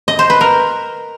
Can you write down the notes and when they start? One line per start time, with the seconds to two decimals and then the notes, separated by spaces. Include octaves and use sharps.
0.08 D#5
0.19 C5
0.30 B4
0.41 A#4